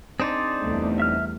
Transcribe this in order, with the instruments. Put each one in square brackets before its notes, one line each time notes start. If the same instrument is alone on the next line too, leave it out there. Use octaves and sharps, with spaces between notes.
[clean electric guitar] C4 D4 D#4 [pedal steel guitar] G#4 C5 D5
[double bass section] E2 G3 A3
[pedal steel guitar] E5 F6